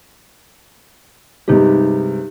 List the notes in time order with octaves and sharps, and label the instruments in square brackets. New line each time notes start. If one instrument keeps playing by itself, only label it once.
[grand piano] G2 C3 G#3 [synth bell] D#4 G4